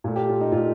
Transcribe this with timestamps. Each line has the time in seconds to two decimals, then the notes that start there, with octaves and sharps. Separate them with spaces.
0.04 A#2 A3
0.16 G4
0.29 F4
0.41 D#4
0.52 A#2 A3 F4